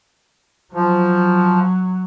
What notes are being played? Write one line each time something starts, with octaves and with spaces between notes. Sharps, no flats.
F3 F#3